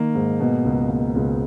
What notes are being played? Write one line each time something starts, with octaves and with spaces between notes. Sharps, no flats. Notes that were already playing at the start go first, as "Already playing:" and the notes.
Already playing: D#3 A#3 D#4
G#2
B2
C#2
A#3
C#2